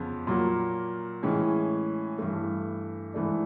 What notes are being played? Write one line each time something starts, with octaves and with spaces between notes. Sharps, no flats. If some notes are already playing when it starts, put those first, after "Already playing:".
Already playing: F2 C#3 B3
A#2 F#3 A#3
A2 E3 G#3 C#4
G2 E3 A3
G#2 E3 A3 D4